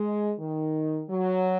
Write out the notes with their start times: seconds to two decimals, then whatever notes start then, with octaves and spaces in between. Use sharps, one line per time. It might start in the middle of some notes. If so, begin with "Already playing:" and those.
Already playing: G#3
0.38 D#3
1.09 F#3